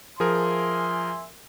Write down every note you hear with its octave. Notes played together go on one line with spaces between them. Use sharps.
F3 G#4 A#4 E5 G#5 C6